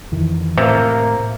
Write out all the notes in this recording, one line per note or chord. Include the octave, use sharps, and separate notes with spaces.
F2 D#3 E3
A2 C3 A#3